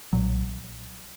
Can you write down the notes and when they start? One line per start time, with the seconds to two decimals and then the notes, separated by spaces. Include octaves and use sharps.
0.13 B1 A#2 F#3